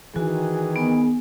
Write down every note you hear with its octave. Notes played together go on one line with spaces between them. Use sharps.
D#3 E3 F#4 G#4
B3